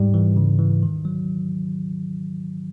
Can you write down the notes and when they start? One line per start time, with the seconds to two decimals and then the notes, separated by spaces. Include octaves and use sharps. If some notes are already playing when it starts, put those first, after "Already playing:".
Already playing: G#2 G3
0.14 E3
0.36 C#3
0.59 E3
0.83 D#3
1.05 F#3